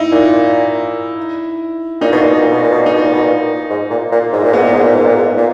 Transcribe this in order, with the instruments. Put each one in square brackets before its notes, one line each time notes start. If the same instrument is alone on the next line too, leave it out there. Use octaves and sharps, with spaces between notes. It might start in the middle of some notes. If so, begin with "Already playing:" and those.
Already playing: [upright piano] D#4 E4
[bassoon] A#2
[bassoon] A#2 [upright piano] D#4
[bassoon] B2
A#2
B2
A#2
B2
A#2
B2
[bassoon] A#2 [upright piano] D#4
[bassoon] B2
A#2
B2
A#2
G#2
A#2
A#2
G#2
A#2
[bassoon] G#2 [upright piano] B3
[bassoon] A#2
G#2
A#2
G#2
A#2
G#2
A#2